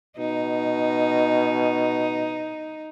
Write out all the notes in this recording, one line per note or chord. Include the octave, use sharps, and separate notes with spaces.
B2 D#4